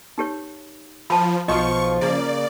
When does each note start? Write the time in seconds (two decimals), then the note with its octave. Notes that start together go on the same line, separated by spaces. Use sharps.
0.18 D#4 G4 C#5
1.10 F3 A5 B5
1.48 B1 B2 F3 F4 C5 D#5 C#6
2.01 C#3 A#3 D5